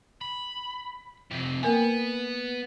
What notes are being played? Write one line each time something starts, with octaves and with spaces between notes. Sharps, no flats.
B5
F2 C3
A#3 B3 A#4 G#5